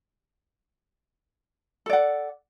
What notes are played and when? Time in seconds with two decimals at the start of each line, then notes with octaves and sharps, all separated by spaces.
1.86 A4
1.90 D5
1.93 F#5